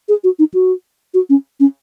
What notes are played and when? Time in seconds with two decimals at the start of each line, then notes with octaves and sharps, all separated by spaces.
0.09 G#4
0.24 F#4
0.39 D#4
0.54 F#4
1.14 F#4
1.30 C#4
1.60 C#4